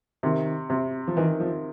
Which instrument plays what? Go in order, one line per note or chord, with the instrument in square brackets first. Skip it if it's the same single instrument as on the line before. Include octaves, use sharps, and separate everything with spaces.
[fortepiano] C3 [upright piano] D#3
[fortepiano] C3
[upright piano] F3
[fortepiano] D#3 [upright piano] E3
[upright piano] F3